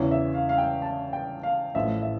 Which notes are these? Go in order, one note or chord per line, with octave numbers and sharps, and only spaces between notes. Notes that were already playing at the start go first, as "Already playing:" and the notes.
Already playing: E2 C#3 E3 C#5
E5
F5
F5
G5
A5
G5
F5
A1 A2 F3 E5
E5